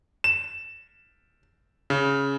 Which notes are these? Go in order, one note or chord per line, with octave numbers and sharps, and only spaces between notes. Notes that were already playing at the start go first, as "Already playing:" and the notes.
E7
C#3